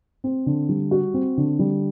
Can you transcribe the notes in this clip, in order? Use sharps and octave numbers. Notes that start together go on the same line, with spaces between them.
C4
D3
G3
F#4
C4
D3
G3